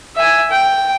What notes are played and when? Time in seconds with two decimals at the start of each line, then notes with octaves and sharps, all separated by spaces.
0.16 E5 G#5
0.51 G5